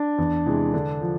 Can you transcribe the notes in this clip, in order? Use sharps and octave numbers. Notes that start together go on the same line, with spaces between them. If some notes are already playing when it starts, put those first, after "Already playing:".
Already playing: D4
E2
C3 E3 G#3
D3
F3